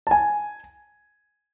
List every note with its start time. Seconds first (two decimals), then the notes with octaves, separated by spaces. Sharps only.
0.07 A5
0.11 G#5